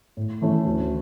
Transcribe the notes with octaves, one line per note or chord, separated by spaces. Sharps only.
A2
E3 A3 C#4 E4
D2